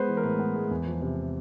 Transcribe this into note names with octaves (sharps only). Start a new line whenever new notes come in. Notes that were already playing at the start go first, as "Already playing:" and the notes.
Already playing: G#3 B3 B4 C5
E3
A#4
A2 B4
B3
G#3
E2
F3
C3